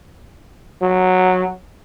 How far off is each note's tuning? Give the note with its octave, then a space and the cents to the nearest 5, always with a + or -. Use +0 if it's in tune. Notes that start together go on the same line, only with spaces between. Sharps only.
F#3 -10